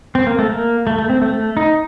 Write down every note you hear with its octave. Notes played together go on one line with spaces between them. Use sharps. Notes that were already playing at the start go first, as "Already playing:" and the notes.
C4
A#3
A3
A#3
A3
A3
C4
A3
A3
D#4